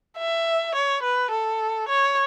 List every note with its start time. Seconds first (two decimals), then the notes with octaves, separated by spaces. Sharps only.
0.18 E5
0.75 C#5
1.03 B4
1.31 A4
1.89 C#5